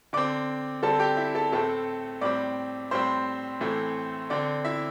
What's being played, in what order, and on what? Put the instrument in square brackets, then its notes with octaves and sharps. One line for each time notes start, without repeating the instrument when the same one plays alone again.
[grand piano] D3 C4 D5 D6
D3 G3 C4 A4 A5
G4 G5
E4 E5
A4 A5
A2 A3 C4 A4 A5
A2 G3 C4 D5 D6
A2 G3 C4 C5
A2 E3 A3 C4
D3 C4 D5
E4 E5